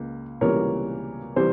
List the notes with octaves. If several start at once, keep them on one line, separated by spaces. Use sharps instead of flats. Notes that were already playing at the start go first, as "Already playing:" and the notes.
Already playing: C#2 A#3
C#2 C3 E3 G3 A#3 A#4 C#5
C3 E3 G3 C5